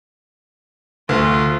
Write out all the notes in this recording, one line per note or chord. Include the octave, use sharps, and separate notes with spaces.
D2 F4